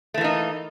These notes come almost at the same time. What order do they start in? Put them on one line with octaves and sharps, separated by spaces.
A3 E3 A#3 D#4